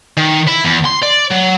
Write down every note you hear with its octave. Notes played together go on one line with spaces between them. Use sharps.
D#3
E4
E2
C6
D5
F#3